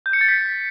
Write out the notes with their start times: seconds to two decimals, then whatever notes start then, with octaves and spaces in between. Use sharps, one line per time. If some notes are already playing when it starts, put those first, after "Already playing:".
0.06 G6
0.13 C#7
0.21 A6
0.29 B6